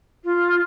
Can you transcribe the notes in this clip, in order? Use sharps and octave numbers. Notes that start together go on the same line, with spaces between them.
F4